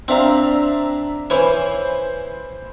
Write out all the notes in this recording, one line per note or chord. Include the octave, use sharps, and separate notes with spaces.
C4 D4 E5 F5 A#5
E3 C#4 B4 C5